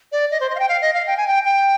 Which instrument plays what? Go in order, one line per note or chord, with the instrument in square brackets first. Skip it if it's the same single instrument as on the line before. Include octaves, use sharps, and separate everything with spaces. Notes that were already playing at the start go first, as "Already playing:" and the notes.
[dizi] D5
D#5
C5
D#5
F5
G5
F5
D#5
F5
G5
G#5
G5
G5